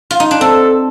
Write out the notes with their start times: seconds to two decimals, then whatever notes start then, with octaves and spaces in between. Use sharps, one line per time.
0.11 F4
0.20 D#4
0.31 D4
0.41 C4 A4